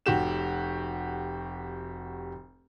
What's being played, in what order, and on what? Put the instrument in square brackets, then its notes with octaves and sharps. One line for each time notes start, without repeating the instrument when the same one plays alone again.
[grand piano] F1 F#4 G4 E7